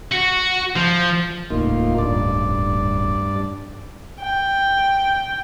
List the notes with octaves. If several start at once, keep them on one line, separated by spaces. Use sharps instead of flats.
F#4
F3
D#1 C#2 A2 A#3 D#4 F4
G2 D5
G5